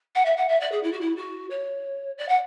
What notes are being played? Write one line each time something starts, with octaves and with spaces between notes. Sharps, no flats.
F#5
E5
F#5
E5
D5
G#4
E4
F#4
E4
F#4
C#5
D5
F#5